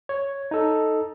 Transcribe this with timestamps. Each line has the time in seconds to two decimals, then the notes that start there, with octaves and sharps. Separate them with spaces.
0.09 C#5
0.51 D#4 A4